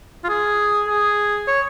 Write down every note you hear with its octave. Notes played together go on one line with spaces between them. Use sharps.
F4
G#4
G#4
C#5